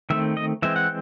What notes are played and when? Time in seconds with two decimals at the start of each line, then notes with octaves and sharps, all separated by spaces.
0.10 D#3 A3 C4 E5
0.37 D#5
0.62 E3 G#3 C4 E5
0.76 F#5